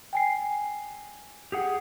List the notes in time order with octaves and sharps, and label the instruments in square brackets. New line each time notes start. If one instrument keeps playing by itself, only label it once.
[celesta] G5 G#5 C7
[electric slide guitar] G4 G#4 F#5